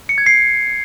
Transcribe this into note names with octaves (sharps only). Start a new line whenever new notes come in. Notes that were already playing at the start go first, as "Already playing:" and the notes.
C#7
G#6
C7